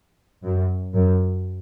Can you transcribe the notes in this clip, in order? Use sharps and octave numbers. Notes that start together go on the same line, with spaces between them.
F#2
F#2